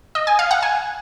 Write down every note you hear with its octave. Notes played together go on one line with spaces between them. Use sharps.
D#5
G#5
F5
F#5
G#5